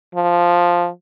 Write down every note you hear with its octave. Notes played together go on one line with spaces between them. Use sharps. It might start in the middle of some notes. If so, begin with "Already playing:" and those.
F3